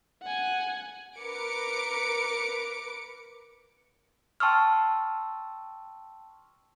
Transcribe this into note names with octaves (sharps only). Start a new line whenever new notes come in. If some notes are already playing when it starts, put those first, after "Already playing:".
F#5 G#5
A#4 B4 D6 C#7 D7
G5 A5 C6 C#6 E6 F6